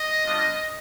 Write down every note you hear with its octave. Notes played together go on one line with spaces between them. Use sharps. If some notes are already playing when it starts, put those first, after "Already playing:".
Already playing: D#5
G3 B3 D4 F4